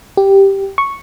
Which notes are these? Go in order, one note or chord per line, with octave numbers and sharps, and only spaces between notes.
G4
C#6